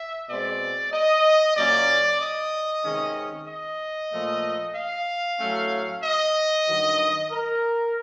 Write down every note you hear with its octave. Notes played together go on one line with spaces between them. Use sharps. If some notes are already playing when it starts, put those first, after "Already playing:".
Already playing: E5
B2 G#3 C4 D5
D#5
A#2 F#3 A#3 C#4 D5
D#5
C3 D#3 G#3 C#4
D#5
A#2 F3 A3
F5
A2 F#3 A3 C#4
D#5
G2 D#3 F#3
A#4